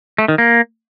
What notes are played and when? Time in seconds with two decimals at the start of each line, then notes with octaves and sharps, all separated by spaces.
0.18 A3
0.28 D#3
0.38 A#3